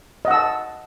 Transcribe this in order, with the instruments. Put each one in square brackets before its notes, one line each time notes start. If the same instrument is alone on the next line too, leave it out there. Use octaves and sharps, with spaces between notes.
[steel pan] D#5
F#5
E6
A5